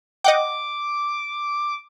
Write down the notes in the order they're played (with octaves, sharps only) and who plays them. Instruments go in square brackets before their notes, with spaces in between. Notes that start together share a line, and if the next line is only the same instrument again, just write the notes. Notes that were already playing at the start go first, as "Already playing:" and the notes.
[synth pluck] D#5 F#5 G5 [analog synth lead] D6